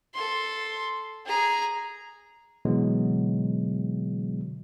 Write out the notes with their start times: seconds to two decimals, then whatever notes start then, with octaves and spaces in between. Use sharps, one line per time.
0.14 A4 C6
1.26 G#4 A#5
2.65 B2 D3 E3 F#3 G#3 B3